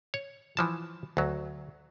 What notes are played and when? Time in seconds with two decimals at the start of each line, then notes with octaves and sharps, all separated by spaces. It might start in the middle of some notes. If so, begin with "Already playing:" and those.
0.14 C#5
0.57 E3 F3 A5
1.17 D2 F#3